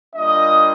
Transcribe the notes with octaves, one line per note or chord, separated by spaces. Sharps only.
G3 A#3 D4 F4 D#5